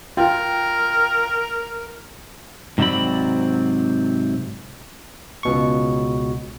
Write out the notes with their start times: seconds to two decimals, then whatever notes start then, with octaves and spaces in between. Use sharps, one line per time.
0.17 F4 A#4 G5
2.78 G#2 C3 F#3 C4 D5 B5
5.43 C#2 B2 C#6